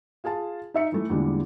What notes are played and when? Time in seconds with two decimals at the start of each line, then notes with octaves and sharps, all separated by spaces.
0.24 F4 G#4 F5 A5
0.74 D#4 E5 C#7
0.92 E3 A3
1.10 E2 A#2 D3 G3 G#3 D4